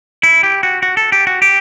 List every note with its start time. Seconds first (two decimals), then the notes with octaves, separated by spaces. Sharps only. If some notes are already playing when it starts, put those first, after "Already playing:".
0.23 E4
0.43 G4
0.63 F#4
0.83 F#4
0.97 A4
1.12 G4
1.27 F#4
1.42 G4